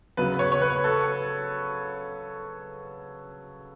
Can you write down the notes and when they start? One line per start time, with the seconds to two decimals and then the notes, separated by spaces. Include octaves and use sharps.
0.17 C#3 F#3 B3 B4
0.39 C#5
0.52 C#5
0.62 B4
0.84 A4